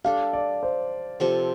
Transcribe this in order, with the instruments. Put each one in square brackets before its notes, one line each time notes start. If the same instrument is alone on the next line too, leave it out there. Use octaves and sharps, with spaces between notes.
[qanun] G3 D4 A4 [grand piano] F5
[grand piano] D5
C5
[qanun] C3 F3 C4 A4